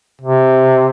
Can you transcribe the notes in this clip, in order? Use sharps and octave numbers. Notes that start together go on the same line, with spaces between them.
C3